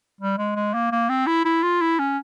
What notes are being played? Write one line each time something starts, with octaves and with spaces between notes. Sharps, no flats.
G3
G#3
G#3
A#3
A#3
C4
E4
E4
F4
E4
C#4